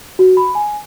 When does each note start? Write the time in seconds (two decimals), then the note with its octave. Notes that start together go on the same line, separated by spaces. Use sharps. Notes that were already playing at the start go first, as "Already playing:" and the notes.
0.19 F#4
0.37 B5
0.55 G#5